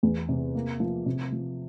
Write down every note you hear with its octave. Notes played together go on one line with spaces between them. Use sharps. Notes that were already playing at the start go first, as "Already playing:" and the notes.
E2
C3
A#3
F3
C3
F3